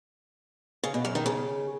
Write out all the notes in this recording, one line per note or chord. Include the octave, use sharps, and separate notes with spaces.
C#3
B2
F#2
D#3
C#3